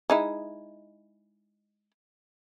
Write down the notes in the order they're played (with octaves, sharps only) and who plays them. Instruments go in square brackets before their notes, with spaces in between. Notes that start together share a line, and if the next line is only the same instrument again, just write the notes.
[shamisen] G#3 D#4 E4